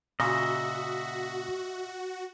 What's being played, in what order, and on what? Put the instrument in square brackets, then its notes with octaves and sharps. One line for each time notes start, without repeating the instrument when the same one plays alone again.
[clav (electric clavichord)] A#2 C#3 [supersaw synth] F#4 [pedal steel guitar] D#5 E5